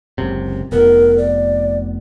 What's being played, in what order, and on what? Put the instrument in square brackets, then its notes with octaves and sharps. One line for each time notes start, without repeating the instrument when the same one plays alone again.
[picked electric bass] F#1 C#2 C3
[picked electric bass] F1 B3 [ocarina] A#4
[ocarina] D5